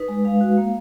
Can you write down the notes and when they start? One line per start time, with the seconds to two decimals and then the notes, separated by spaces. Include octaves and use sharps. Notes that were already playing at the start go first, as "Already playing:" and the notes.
Already playing: D#4 B4
0.08 G#3
0.25 G#3 F5
0.41 F#4
0.57 A#3